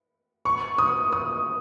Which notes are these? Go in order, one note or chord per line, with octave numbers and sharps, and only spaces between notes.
C#6
D#6
D#6